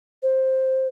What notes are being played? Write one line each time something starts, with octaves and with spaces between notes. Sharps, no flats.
C5